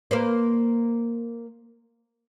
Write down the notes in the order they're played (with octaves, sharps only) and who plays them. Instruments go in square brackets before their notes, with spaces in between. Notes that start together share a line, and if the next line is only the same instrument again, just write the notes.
[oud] A#3 B4 C5